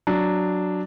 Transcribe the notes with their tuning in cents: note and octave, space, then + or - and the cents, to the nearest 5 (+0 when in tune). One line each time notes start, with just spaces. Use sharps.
F#3 +0 D4 +0